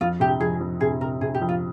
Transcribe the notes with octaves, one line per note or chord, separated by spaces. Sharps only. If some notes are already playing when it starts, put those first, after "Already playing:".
F2 F4
C3 G4
F2 G#4
F2
C3 G#4
C3 A#4
C3 G#4
G4
F2
F4